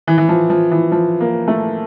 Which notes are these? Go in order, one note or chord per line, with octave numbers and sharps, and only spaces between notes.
E3
E3
F3
F3
E3
F3
A#3
A3